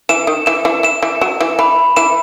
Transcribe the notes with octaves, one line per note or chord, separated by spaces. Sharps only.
E3 E7
D#3
E3 E7
E3
E3 E7
E3
F#3 E7
E3
E3 B5
E3 E7